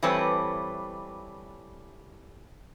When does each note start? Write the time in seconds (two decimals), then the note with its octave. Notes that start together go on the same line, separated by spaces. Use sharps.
0.03 E3 G3 A3 C4 B4 C#5